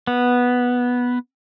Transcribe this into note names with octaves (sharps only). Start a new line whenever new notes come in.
B3